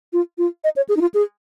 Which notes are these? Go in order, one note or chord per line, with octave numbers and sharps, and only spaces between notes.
F4
F4
D#5
C#5
G#4
D#4
F4
G#4